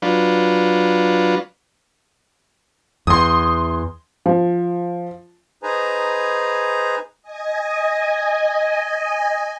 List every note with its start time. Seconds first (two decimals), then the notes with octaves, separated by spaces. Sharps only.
0.02 F#3 D4 F4 B4
3.07 E2 C6 D#6
4.26 F3
5.63 D#4 G#4 B4 C5 G#5 A#5
7.22 D#5 G#5